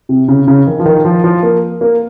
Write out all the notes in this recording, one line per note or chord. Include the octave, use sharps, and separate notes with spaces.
C3
C#3
C#3
D#3
F3
D#3
F3
F3
A#3
A#3